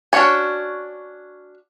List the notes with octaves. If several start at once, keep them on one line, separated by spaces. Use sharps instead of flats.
C#4 D4 F#4 C#5 G#5